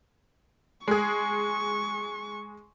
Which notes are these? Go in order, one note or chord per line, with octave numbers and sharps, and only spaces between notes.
G#3 G#4 C#6